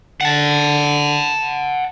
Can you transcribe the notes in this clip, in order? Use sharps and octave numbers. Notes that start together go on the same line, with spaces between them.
D3 F#5 A5